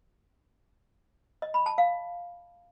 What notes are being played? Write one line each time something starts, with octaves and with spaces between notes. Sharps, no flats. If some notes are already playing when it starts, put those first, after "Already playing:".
D#5
B5
A5
F5